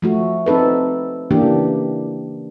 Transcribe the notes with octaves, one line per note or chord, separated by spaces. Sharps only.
F3 A3 F#4
C4 D#4 A4 B4
C#3 E3 A#3 D4 G4